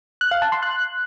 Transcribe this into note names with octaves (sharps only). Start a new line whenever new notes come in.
F#6
F5
A5
C6
F#6